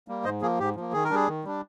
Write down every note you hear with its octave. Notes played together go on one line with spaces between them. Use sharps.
G3 A#3
G#2 C5 D#5
F3 A#3 G#4
G#2 G4
F3 A#3
D#3 G#4
A#4
G3 D4 G#4
D#3
G3 D4